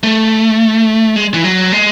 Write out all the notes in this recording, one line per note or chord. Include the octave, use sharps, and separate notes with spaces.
A3
G#3
E3
F#3
G#3